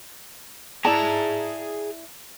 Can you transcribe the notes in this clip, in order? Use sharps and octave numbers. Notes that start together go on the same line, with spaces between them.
E4 G#4 D5 A5 A#5